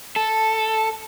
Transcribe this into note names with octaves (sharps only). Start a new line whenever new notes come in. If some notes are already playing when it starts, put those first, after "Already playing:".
A4